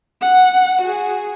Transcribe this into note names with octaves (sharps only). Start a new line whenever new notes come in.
F#5
F#4 G#4